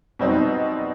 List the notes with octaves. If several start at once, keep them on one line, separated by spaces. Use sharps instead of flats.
B2 G3 C4 D#4